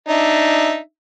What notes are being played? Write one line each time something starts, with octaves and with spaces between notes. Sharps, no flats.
D4 D#4 E5